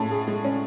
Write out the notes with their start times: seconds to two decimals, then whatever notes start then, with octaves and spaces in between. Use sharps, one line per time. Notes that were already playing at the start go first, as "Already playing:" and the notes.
Already playing: A2 G#3 C#4 G#4 A5
0.11 G#4
0.28 G#3
0.45 C#4